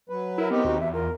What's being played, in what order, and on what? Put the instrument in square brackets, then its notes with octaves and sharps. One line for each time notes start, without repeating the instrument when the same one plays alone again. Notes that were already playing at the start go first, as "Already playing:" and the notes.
[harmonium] F#3 B4
[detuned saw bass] E4 [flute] A#4
[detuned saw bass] B3 [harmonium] C4 D#4 G4
[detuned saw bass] D#2 [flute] F#4
[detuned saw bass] E2 [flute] E5
[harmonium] F4 [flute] A#4